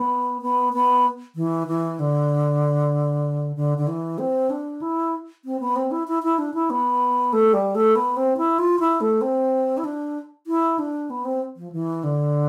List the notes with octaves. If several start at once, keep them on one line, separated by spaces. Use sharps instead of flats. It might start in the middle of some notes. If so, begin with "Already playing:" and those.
Already playing: B3
B3
B3
E3
E3
D3
D3
D3
E3
C4
D4
E4
C4
B3
C4
E4
E4
E4
D4
E4
B3
A3
G3
A3
B3
C4
E4
F4
E4
A3
C4
E4
D4
E4
D4
B3
C4
F3
E3
D3